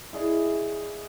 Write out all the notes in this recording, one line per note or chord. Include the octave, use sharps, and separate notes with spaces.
E4 G#4 D5 D#5